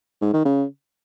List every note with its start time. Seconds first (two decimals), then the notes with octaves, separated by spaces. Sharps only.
0.22 G#2
0.34 D#3
0.45 C#3